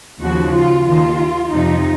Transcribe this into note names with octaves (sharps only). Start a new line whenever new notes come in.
D#2 C#3 F3 F#4
F4
D#2 D#3 F4
F2 C3 F3 D#4